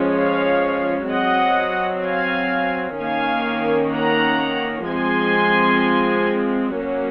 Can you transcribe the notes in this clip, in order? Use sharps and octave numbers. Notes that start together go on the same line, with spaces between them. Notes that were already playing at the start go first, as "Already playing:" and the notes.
Already playing: F3 G#3 C#4
C#5 F5
F#3 C4 D#5 F#5
F5 G#5
D#3 A#3 C#4 F5 G#5
F#5 A#5
F3 G#3 C4 G#5 C6
F#3 A#3 C#4